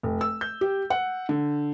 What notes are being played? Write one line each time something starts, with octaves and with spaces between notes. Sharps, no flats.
F1
E6
G6
G4
F#5
D3